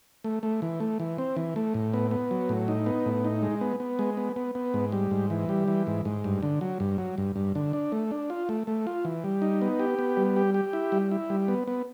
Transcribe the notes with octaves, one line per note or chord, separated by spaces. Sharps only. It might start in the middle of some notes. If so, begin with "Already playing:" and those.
A3
A3
E3
A3
E3
C4
E3
A3
A2
B3
B3
F#3
A2
D#4
B3
A2
D#4
G#3
B3
B3
G#3
B3
B3
B3
G#2
G3
G#2
E3
G3
E3
G#2
G#2
G2
D3
F#3
G2
F#3
G2
G2
D3
D4
A3
D4
F4
A3
A3
F4
E3
G3
D#4
B3
G4
B3
G3
G4
G4
E4
G3
E4
G3
B3
B3